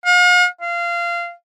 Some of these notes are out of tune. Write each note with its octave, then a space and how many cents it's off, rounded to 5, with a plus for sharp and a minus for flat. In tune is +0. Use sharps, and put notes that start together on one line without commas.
F5 +45
F5 -20